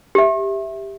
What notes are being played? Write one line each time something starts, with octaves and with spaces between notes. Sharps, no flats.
G4 E5